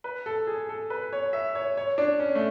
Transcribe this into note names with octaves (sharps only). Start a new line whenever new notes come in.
B4
A4
G#4
A4
B4
C#5
E5
C#5
C#5
D4
C#4
A3